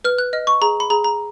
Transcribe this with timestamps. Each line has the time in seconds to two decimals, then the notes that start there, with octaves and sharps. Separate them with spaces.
0.04 B4 F6
0.18 F#6
0.33 D#5 F6
0.47 C#6
0.62 G#4 A#5
0.80 B5
0.90 G#4 A#5
1.04 A#5